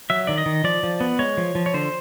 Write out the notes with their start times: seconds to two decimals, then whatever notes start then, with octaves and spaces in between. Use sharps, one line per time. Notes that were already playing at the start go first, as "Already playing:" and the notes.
0.10 F#3 E5
0.27 D#3 D5
0.38 D#5
0.46 D#3
0.64 F3 D5
0.83 F3
1.00 B3
1.19 G#3 C#5
1.37 F3
1.55 F3
1.66 C#5
1.74 D3 C5